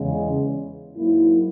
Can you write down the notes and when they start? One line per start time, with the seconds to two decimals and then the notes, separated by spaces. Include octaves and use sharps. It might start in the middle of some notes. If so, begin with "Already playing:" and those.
Already playing: E2 C#3 G#3
0.97 G#2 F#3 A#3 E4